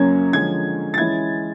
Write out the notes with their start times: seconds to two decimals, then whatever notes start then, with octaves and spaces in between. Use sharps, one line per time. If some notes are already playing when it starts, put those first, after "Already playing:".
Already playing: F#2 C#3 F#3 A#3 C#4 G#6
0.33 D3 F3 G#3 C#4 G#6
0.94 A6
0.98 E3 G#3 C#4 E4 G#6